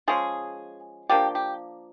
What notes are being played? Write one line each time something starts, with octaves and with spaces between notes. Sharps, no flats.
F3 G#3 C#4 G#4
F3 A#3 D4 G4
G4